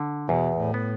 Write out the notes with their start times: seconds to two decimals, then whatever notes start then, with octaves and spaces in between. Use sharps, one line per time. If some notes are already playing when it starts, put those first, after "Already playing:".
Already playing: D3
0.29 E2 B2
0.58 A2
0.74 B3